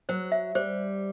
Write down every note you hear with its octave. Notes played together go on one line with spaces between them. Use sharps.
F#3 C5
E5
G3 C5